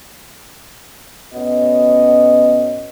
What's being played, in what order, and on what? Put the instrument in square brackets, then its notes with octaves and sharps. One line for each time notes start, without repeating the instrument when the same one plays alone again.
[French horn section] A2 B3 C#4 F#4 D#5